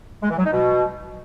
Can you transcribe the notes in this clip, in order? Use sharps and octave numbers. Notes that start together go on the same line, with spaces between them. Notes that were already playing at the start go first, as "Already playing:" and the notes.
G#3
E3
F#3
D#4
B2